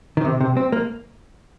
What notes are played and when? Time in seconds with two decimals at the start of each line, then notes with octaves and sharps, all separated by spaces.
0.17 D#3
0.25 C3
0.41 C3
0.57 C4
0.72 A#3